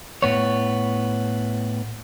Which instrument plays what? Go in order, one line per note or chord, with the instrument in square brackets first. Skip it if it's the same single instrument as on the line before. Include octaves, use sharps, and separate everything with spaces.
[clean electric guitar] A2 B3 C#5